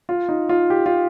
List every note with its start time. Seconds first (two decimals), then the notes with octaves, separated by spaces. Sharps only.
0.09 F4
0.29 D#4
0.49 F4
0.70 G4
0.86 F4